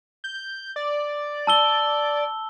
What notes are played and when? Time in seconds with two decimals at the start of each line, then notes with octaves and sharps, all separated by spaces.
0.24 G6
0.76 D5
1.47 A5 E6 G7